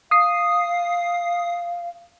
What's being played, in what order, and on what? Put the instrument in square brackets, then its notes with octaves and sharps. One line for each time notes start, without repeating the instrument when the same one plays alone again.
[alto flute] F5 [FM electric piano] D#6 C7